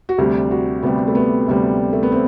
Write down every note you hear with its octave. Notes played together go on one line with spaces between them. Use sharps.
F#4
D2 C3 G3 G4
F#4
D2 C3 G3 B3
A3
B3
D2 C3 G3
A3
B3
C4